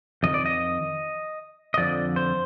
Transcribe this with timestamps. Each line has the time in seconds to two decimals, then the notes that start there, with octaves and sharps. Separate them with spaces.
0.23 F2 D#3 D#5
0.34 D5
0.46 D#5
1.74 D#5
1.77 F2 D3 F3 D5
2.16 C5